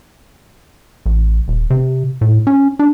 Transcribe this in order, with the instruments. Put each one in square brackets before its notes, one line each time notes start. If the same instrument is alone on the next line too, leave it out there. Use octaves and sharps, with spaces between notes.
[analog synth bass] A1
D#1
C3
A2
C#4
D4